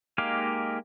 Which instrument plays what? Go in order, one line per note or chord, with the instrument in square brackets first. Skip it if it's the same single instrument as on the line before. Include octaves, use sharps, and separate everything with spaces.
[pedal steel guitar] G#3 A#3 D#4 G4 F5